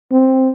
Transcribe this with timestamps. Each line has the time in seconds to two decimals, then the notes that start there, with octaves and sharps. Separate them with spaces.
0.12 C4